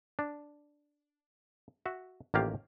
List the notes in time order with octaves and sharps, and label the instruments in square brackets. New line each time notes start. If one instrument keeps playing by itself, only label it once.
[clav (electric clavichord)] D4
F#4 E5
A1 D#3 A#3 F4 G4 F5